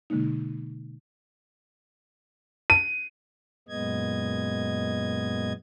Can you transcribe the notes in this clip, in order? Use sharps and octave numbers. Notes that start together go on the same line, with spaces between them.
B2 D3 G#3 A#3 D#4
D#7
F#2 A#2 G#3 B3 D#5 G#6